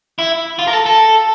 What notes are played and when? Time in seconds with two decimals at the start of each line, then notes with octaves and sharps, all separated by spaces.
0.19 E4
0.59 F4
0.68 A#4
0.73 A4
0.86 A4